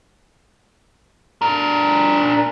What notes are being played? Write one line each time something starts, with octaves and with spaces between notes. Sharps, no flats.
D4 A#4